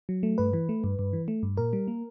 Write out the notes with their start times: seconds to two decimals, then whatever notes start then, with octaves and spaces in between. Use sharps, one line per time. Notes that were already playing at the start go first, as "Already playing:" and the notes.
0.09 F#3
0.23 A3
0.38 G2 B4
0.53 E3
0.69 A3
0.84 G2
0.99 G2
1.13 E3
1.28 A3
1.43 G2
1.57 A#2 A#4
1.73 G3
1.88 A#3